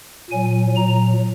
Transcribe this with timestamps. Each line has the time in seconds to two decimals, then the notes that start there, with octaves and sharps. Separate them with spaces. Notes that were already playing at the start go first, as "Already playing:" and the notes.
0.30 A#2 F#3 G#5
0.76 A#2 F#3 A#5